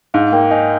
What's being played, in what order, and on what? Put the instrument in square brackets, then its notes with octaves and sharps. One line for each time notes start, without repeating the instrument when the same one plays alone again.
[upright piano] G#2 [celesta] F5
[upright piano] A#3 [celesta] G5
[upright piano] D#4 [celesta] G#5